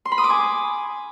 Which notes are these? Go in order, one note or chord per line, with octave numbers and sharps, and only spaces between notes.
C6
B5
D#6
D6
G#5